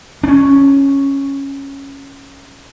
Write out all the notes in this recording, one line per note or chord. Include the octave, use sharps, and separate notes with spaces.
C#4 D4